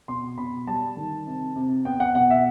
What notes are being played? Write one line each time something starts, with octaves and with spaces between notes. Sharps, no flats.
B2 C6
B2 B5
G3 A5
D#3
C3
C3
B3 G5
F#5
B2 F#5
E5